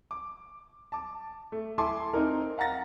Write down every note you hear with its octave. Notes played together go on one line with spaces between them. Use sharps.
D6
A5 D6
A3
E4 A4 G#5 A5 C6 D6
C4 D#4 A#4
F5 F#5 A#5 A6 A#6